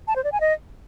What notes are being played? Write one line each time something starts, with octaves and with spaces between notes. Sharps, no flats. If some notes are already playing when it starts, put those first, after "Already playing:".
A5
C5
D5
G#5
D#5